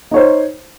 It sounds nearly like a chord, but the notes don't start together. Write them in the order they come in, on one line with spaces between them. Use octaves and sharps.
D#4 C#5 C5